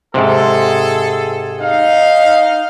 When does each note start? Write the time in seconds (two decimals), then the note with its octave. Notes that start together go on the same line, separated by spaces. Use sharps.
0.14 G#2 C3 G#4 A4
1.62 D#4 F5